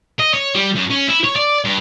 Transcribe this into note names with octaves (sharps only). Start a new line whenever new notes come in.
D#5
C#5
G3
F#2
C#4
E4
C#5
D5
G2